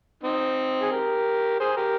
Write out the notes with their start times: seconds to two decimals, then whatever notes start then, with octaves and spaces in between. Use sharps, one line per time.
0.23 C4 D#4
0.82 G#4
0.91 G4 A#4
1.60 G#4 C5
1.77 G4 A#4